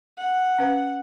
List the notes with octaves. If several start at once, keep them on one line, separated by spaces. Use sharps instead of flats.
F#5
C#4 B4 F5